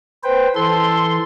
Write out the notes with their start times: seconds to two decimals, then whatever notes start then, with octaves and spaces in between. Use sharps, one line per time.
0.24 B4 C5 G5
0.56 E3 A4 C6